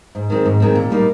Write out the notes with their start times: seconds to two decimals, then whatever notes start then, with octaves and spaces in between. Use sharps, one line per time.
0.15 G#2
0.30 D#3 G#3 C4
0.46 G#2
0.60 D#3 G#3 C4
0.75 A#2
0.90 G3 A#3 D#4